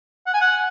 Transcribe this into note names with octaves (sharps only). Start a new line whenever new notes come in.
F#5
G#5
F#5